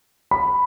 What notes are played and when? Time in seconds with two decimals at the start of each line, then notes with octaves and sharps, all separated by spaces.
0.31 B5